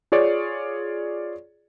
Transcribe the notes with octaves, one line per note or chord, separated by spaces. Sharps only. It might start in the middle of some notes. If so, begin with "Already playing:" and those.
F4 G#4 C#5 D5